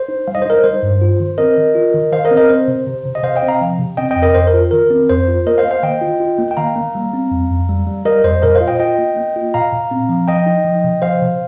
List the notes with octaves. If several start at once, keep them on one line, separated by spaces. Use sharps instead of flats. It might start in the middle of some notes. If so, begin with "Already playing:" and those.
Already playing: C5
D#4
G3 F5
D#5
C5
D#4 A#4 D#5
G3 C5
G2
F4
D#3
C4 A#4 D#5
D#3
F4
D#3
D#3 C5 F5
A#4 D#5
C4
A#4 D#5
C4 C5
C3
C3
C3
D#5
C3 C5 F5
D#5 G5
C4
F5 A#5
F3
C3
C4 D#5 G5
F2 D#5 G5
A#4 D#5
F2 C5
A#4
F4
D#3 A#4
C4
F2 C5
F4
A#3 A#4 D#5
C5 F5
A#3
C5 F5
D#3 D#5 G5
F4
F4
A#3
G5
D#3 F5 A#5
A#3
G3
C4
F2
F2
G3
G3
G3 A#4 D#5
F2 C5
A#2 A#4 D#5
C5 F5
F4
D#5 G5
F4 D#5 G5
A#3
A#3
F4
A#2 F5 A#5
A#2
C4
F3
F3 D#5 G5
D#4
F3
C3
F3 C5 F5
C3